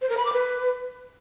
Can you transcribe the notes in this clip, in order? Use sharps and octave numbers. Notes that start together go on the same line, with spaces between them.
C5
A#4
B5
D6
B4